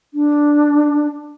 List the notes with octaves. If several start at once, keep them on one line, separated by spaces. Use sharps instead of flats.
D4